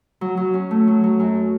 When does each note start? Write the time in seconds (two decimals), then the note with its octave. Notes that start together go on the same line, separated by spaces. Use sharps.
0.21 F#3
0.37 F#3
0.54 C#4
0.71 A3
0.87 F#3
1.04 F#3
1.20 F#2